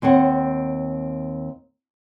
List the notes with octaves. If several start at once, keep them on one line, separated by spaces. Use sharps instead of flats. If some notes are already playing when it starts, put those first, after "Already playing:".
D#2 C4 C#5 F#5